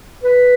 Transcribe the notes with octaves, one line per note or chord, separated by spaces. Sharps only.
B4